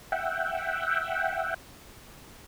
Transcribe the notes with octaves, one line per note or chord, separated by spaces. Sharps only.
E5 F#5 G5